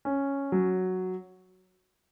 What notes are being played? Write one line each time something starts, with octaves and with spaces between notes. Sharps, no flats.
C#4
F#3